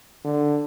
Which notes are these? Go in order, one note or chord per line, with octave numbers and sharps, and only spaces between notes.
D3